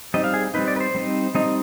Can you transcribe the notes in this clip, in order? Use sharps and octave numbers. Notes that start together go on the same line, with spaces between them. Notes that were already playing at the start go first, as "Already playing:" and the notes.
G3 C4 D#4 D#5
F5
G#4
G3 C4 D#4 B4
D5
B4
C5
G3 C4 D#4
G3 C4 D#4 D#5